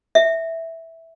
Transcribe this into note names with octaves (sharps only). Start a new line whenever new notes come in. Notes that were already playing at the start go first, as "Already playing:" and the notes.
E5